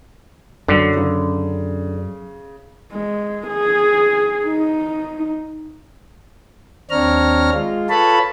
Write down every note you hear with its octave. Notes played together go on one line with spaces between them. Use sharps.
F#2 D3 F#3
C#3
G#3
G#4
D#4
D#2 C4 D4 C#5 A#5 F6
G#3 F4
F4 A4 B4 C#5 A5 B5